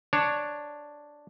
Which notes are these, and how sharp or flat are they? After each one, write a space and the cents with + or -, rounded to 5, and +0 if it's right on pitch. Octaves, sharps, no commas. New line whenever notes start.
D4 +0 C#5 +0